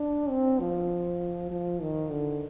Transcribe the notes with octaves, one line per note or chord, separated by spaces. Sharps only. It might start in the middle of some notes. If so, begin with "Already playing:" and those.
Already playing: D4
C4
F3
F3
D#3
D3